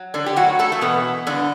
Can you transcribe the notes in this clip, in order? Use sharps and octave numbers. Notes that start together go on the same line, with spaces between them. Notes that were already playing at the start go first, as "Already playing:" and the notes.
Already playing: F#3
D3 D4
G4
A2 F#3 F#4
A3 A4
A3
B2 E3 B3
G2 D3 D4